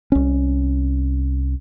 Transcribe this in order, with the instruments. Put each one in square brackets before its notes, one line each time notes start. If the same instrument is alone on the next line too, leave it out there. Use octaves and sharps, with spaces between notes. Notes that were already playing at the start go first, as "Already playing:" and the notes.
[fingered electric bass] C2 C#4